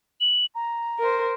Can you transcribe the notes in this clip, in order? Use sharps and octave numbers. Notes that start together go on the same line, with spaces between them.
F#7
A#5
A#4 C5